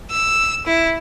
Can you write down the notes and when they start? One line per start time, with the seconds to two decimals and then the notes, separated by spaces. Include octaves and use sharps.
0.12 E6
0.66 E4